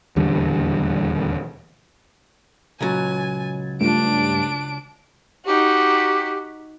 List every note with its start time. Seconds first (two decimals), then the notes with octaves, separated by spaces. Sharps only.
0.16 D#1 E2 D3 G3
2.81 C#2 A#2 F#3 G#5 G#6 A6
3.81 G2 A3 D4 F4 D7
5.46 D#4 F#4 G4